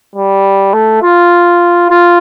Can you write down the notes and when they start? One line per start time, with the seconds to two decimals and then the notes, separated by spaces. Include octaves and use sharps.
0.15 G3
0.73 A3
1.02 F4
1.90 F4